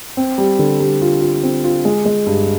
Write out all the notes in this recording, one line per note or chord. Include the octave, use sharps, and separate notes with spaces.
C4
G3
D3
G3
F4
F4
C4
F4
G#3
G#3
G2